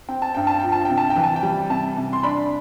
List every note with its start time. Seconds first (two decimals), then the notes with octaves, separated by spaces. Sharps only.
0.09 C4 G5
0.22 A5
0.35 G2 G5
0.47 A5
0.60 F3 G5
0.72 A5
0.85 C3 G5
0.97 A5
1.10 G5
1.16 E3
1.24 A5
1.36 G5
1.43 G3
1.70 C3 A5
1.97 C3
2.13 C6
2.23 D4 B5